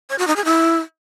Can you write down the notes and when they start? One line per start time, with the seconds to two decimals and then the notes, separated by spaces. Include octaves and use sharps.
0.10 C#5
0.19 F#4
0.27 D#4
0.36 G#4
0.45 E4